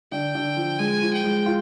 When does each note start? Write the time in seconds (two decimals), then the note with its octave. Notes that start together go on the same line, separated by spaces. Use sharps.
0.12 D3 G5
0.35 D3
0.57 F3
0.79 G#3 G#5
1.02 F3
1.13 G5
1.24 G#3
1.46 F4